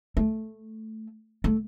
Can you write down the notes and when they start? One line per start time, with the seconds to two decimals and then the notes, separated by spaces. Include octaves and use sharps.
0.17 A3
1.44 A3